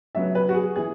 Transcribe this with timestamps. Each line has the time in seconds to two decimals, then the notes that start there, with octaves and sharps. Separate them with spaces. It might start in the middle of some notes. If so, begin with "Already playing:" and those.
0.15 C#3 F#3 B3 E5
0.35 B4
0.49 F#4
0.54 G#4
0.75 E3 B3 G#4